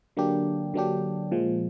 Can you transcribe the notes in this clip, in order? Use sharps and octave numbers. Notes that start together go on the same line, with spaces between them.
D3 F#3 A#3 D4 G4
D3 F#3 A#3 D4 G4
A#2 F3 G#3